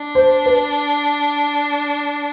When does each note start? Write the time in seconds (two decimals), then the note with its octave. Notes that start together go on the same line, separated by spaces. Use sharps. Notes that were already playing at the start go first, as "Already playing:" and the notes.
Already playing: D4
0.15 C5
0.46 B4